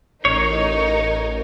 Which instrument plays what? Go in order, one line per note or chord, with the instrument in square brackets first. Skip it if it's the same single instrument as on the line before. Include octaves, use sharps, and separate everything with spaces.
[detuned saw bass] A1 [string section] D#4 A#4 [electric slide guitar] C#5